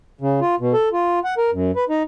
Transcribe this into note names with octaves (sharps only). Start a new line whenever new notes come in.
C#3
F4
B2
A4
F4
F#5
A#4
F#2
B4
D#4